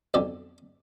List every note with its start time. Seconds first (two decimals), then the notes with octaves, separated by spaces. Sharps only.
0.14 B1 F2 D3 G4 D5